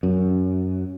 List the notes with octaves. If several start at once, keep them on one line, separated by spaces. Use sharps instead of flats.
F#2